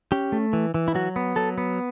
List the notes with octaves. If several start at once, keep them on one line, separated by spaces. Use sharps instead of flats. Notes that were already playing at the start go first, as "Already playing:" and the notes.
C#4 G4
A3
E3
E3
E4
F#3 F#4
B3
F#3 A4
B3